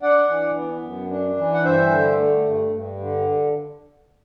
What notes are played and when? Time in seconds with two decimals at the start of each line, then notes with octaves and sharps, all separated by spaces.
0.02 D4 D5 F#5
0.29 E3
0.55 B3
0.82 F#2
1.10 D4
1.38 E3
1.54 F#5
1.64 G2 C5 E5
1.91 D3
2.18 A3
2.45 G2
2.73 G2
3.00 D3